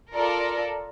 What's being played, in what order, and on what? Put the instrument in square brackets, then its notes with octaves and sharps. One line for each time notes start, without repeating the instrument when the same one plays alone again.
[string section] F4 A4 A#4 D5